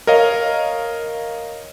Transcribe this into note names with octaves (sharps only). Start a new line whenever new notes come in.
A#4 C#5 D#5 F5